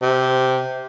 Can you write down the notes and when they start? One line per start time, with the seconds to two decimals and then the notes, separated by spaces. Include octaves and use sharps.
0.02 C3